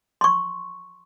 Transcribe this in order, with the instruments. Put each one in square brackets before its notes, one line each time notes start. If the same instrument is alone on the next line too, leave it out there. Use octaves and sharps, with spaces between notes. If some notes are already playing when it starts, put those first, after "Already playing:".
[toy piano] C6 C#6